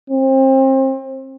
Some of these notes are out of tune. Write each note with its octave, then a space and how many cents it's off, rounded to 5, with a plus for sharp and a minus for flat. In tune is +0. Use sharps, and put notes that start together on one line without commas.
C4 +30